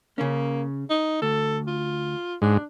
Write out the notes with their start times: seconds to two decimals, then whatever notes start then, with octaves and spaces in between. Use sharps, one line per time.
0.18 C#3 A#3 C#4
0.90 D#4
1.22 D2 A4
1.67 F4
2.42 G#2 D4